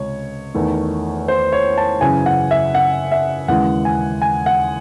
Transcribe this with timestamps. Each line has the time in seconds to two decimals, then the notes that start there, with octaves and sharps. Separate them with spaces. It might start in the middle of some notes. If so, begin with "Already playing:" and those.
Already playing: C#2 C3 C#5
0.55 E2 D#3 A3
1.28 C5
1.52 C#5
1.78 A5
2.01 F#2 C#3 E3 G#5
2.26 F#5
2.51 E5
2.75 F#5
3.12 E5
3.48 D#2 C#3 E3 G#3 F#5
3.85 G#5
4.22 G#5
4.46 F#5